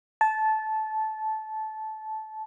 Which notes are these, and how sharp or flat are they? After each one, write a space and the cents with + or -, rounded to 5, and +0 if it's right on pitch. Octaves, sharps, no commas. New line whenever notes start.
A5 -15